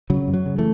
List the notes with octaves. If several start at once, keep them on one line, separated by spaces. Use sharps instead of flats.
C#3 F#3
F#2
F#3
C#3
E3 A3